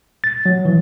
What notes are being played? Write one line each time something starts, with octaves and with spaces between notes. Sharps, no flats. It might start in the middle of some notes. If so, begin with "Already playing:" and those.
A6
F#3
E3